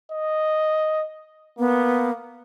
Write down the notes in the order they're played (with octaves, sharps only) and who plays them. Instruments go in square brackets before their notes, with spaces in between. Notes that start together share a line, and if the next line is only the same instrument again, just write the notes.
[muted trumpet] D#5
[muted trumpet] A#3 [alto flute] B3